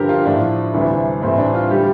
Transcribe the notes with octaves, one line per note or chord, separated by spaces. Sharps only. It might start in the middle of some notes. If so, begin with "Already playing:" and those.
Already playing: G2 D3 F3 G4 A#4
F4
A2 F3 D4
D2 C3 E3 G3
A2 E3 G3 C4
D4
F4
D3 G3 G4